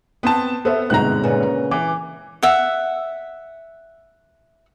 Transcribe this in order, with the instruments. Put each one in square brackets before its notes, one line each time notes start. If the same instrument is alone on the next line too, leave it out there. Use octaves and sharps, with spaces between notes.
[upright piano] B3 C4 A5 [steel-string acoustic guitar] G5
[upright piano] B3 [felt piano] A4 C5 E5
[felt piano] G1 G#2 C4 [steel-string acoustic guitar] B2 [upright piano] A#5 F#6
[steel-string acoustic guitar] A#2 C#3 B3
[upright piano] E3 [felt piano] D6
[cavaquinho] E5 F#5